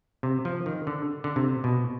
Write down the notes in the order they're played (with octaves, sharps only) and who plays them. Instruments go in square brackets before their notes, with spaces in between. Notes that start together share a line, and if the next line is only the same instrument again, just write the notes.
[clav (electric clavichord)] C3
F3
D#3
D3
D3
C3
B2